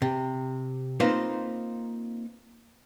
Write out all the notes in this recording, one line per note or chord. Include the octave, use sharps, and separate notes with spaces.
C3
A#3 C4 D#4 F4 B4 C5